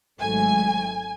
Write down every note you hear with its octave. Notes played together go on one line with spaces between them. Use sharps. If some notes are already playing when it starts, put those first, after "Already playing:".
G#1 G#2 F#3 A3 G#5